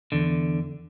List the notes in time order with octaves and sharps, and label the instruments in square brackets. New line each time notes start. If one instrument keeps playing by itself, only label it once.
[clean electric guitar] E2 D3